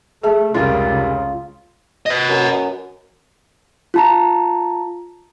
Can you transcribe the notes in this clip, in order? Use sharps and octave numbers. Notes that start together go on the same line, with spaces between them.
A3 G#4 E5 A5
F1 C#2 C#3 G3 F4 A#4
B4 D#5
F#2
F4 A5 A#5